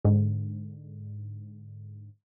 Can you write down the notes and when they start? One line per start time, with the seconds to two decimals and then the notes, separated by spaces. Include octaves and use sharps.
0.04 G#2 D3